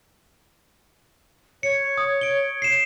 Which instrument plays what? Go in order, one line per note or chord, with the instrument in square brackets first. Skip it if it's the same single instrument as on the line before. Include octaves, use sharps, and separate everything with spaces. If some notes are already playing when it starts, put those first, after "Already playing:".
[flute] C#5 [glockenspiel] C#7
[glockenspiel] D#6
D7 G7
C7 E7